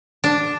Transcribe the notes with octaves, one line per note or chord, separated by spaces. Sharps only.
D4